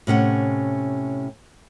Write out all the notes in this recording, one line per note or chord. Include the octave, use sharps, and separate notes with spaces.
A2 C3 C#4 F#5